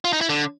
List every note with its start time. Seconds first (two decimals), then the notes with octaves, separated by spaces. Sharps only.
0.05 F4
0.13 D#4
0.21 E4
0.29 D3